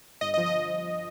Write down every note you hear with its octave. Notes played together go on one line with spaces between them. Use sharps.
G1 D#5
D#5
F3
D#5